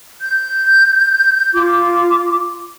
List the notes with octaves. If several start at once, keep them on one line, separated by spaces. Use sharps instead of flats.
G6
F4 D6